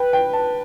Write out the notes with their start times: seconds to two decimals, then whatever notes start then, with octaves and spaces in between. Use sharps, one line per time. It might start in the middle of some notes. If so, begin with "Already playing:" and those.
Already playing: B4 G5
0.13 G5
0.33 A5